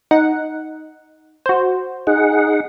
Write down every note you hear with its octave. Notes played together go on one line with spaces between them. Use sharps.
D#4 F#5
F#4 C5
D#4 G#4 F#5